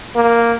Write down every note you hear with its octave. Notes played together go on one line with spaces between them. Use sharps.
A#3